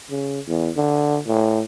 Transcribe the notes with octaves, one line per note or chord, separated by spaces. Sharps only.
C#3
E2
D3
A2